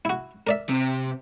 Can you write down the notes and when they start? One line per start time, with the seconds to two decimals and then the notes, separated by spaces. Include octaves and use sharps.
0.05 E4 F#4
0.47 A#4 D5 E5
0.69 C3